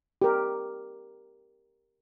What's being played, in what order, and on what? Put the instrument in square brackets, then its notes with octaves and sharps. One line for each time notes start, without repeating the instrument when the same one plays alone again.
[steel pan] G4 A#4